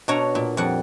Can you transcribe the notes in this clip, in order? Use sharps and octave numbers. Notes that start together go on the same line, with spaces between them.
B2 D4 C#5 A#5
A#2
F2 G3 F#5